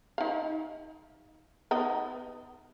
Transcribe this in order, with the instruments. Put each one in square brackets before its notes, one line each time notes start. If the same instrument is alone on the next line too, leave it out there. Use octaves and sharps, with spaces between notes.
[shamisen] D#4 F5
B3 D#4 D#5